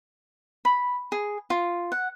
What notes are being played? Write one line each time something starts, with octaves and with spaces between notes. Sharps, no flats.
B5
G#4
F4
F#5